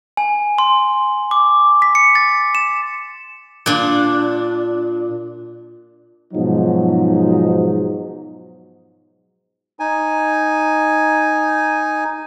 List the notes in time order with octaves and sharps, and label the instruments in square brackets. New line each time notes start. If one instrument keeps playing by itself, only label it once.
[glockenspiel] G#5
C6
D6
B6
C#7
A6
E7
[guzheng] A#2 D4
[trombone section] G#2 B2 F3 F#3 D#4
[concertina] D#4 G#5